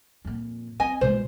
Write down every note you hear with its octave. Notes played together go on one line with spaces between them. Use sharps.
F2 A#2
C4 D#5 G#5
B2 G#3 C5